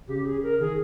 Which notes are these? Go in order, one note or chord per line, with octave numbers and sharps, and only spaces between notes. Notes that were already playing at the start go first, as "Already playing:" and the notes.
C#3 G4
G#4
A#4
D#3 G#4